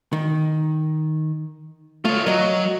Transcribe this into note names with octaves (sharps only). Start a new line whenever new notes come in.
D#3
A3 F4 C#5
F#3 A#4 D#5